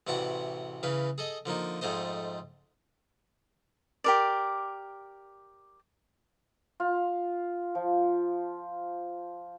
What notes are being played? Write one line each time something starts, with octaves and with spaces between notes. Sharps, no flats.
A1 C3 E3 F#4 D5 F#5
C#3 E3 B4 F5
G#4 A4 D#5
D3 F3 A#3 D#4
F2 G#2 A3 C5 D#5
G4 A#4 D5
F4
F3